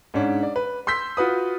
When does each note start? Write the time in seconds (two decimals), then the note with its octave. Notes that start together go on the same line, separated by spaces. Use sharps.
0.14 G#2 C#4 D4
0.43 D5
0.56 B4
0.87 C6 E6 G6 B6
1.17 F4 F#4 B4 D#6